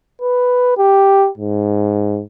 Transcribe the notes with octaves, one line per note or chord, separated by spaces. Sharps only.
B4
G4
G#2